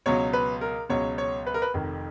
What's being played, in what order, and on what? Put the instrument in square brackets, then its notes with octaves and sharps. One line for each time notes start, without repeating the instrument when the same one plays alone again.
[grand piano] C#2 B2 F#3 C#5
B4
A#4
C#2 B2 F#3 C#5
C#5
B4
A#4
B4
F1 F2 D#3